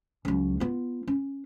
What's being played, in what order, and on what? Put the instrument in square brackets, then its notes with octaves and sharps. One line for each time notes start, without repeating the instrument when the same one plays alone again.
[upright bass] C#2 F#3
B3 F4
C#4